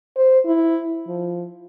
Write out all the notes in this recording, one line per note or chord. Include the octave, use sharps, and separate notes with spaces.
C5
E4
F3